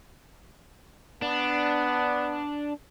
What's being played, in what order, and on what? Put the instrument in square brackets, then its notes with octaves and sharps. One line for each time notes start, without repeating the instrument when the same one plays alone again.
[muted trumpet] B3 [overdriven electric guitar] D4